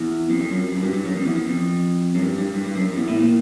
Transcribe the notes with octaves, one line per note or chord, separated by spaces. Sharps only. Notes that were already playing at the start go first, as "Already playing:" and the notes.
Already playing: E2
F2
F2
F#2
F#2
G2
G2
F#2
F2
E2
E2
F2
F#2
G2
G2
G2
G2
F#2
F2
E2
A2
A#2